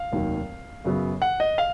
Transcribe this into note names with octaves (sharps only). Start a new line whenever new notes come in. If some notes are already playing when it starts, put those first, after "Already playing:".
Already playing: F5
F1 D#2 D#3 F#3
F#2 C#3 F#3 B3
F#5
D#5
F5